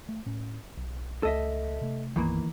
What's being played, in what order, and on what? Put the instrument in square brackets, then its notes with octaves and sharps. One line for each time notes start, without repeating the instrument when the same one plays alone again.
[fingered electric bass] A3
A2 C#4
B1
[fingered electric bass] C#2 A3 [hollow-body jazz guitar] A4 D#5 E5
[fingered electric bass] C3 A3
[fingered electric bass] B1 F#2 B3 [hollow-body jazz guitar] D#3 E3 A#3